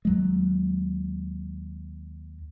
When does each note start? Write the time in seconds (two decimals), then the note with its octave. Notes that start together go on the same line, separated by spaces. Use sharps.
0.05 D#2 F#3 G#3